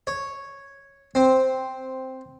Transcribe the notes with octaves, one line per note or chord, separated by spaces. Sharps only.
C#5
C4